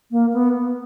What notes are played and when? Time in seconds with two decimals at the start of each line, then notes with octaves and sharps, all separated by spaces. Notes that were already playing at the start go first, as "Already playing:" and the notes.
0.11 A#3
0.33 B3